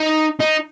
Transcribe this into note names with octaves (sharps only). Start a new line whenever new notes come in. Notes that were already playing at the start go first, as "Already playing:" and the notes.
Already playing: D#4
D#4